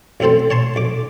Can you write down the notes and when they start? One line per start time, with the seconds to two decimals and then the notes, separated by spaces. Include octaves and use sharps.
0.20 A1 F#2 C4 A4 C5
0.50 C#5 A5 C6
0.76 B1 D6